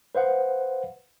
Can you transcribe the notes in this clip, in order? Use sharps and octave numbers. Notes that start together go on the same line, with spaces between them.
B4 C5 F5 F#5